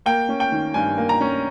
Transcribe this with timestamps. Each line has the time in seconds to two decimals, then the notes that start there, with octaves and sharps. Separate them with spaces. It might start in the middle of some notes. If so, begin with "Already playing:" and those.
0.06 A#3 G5
0.29 C#4
0.40 G5
0.52 D#3
0.74 G2 G#5
0.98 A#3
1.09 A#5
1.21 C#4